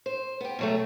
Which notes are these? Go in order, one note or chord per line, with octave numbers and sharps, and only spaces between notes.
C5
B3 G4
B2 F#3 A3